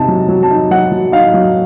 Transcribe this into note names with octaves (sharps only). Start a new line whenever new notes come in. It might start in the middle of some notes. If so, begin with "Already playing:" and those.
Already playing: C3 D#4 A5
F#3
F#3
A5
D#4
F#3 F#5
F#3
D#4 F5
F#3